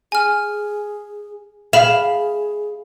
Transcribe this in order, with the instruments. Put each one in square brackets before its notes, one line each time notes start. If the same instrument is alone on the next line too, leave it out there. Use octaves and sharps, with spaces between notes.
[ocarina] G#4 [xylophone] G#5 F6
[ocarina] G#4 [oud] F5 [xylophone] B5 B6 E7